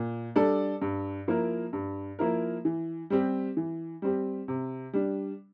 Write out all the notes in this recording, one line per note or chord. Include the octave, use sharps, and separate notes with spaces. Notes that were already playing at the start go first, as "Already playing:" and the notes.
Already playing: A#2
G3 D4 A4 D5
G2
F3 A#3 E4 A#4
G2
F3 A#3 E4 A#4
E3
G3 C4 G4
E3
G3 C4 G4
C3
G3 D4